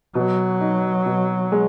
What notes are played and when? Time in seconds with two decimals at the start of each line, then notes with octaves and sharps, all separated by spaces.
0.15 B2 F#3
0.61 D#4
1.06 B2
1.52 G#3